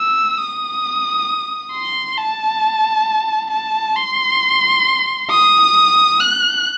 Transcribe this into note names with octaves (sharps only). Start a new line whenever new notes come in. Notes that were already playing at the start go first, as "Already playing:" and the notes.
Already playing: E6
D#6
C6
A5
A5
C6
D#6
F#6